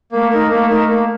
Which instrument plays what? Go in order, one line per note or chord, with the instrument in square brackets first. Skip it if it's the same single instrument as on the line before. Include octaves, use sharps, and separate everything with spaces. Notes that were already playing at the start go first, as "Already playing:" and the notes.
[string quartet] A3 [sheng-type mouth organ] A#3
[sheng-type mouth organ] D#4 A#4
[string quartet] A3 [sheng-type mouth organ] A#3
[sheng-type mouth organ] D#4 A#4
A#3